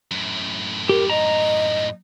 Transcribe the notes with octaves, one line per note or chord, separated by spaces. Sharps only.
F#2 A2
G4 A#4
D#5 A#5